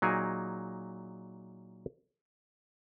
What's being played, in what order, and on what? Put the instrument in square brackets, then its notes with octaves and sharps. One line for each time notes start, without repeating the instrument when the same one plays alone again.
[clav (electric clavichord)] A#2 F#3 D#4 G#4 A#4 G#5